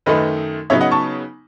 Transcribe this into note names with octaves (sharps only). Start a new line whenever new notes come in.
F#2 D#3 A3 D#4 B4 D#5
C#3 F#3 B3 D#4 C#5 E5
D#5 F#5
A5 C#6